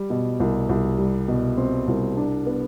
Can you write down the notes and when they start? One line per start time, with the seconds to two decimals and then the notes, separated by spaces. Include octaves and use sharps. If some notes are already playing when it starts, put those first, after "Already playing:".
Already playing: G3
0.10 B2
0.40 C2
0.69 C2
0.98 G3
1.28 B2
1.58 C4
1.88 C2
2.17 D4
2.46 B3